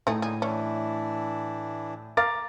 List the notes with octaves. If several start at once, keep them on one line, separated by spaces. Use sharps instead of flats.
A2 A3 D#4 G#4
D3 A#3 D#4 G#4
E3 C#4 D4 E4
A#4 F5 A#5 D6 A6